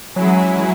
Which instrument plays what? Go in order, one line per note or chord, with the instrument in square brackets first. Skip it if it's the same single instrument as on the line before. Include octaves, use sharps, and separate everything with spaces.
[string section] E3 G#3 C#4 E4 G#4 [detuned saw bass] F#3